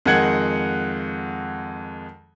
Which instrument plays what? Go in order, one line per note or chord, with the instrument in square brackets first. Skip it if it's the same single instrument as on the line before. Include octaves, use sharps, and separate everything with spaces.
[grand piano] F2 D#3 G#3 F#5 G#6 F#7